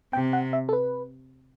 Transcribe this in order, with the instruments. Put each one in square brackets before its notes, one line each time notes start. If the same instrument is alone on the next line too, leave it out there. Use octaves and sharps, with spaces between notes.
[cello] C3 [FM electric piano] G5
[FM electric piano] F#5
E5
A4
B4